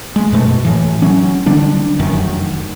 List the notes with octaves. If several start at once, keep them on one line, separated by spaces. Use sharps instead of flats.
G#3
F#2 B2 A3
A2 E3
F#3 C#4
D3 G3 D4
F1 F#2 D#3